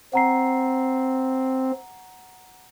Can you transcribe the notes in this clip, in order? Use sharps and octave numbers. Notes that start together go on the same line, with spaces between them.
C4 F#5 A#5 C7